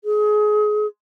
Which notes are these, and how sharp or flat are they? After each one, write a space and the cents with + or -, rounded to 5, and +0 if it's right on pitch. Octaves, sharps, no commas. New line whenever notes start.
G#4 +25